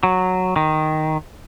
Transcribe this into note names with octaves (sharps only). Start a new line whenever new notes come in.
F#3
D#3